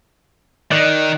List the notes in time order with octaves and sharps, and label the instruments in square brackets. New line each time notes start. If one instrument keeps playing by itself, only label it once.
[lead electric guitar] D#3 [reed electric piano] D5 D#5 F#6